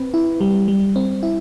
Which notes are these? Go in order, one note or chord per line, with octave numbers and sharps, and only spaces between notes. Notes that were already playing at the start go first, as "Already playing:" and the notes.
Already playing: C4 B4
E4
G3
G3
C4
E4